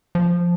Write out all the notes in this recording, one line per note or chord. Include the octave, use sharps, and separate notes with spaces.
F3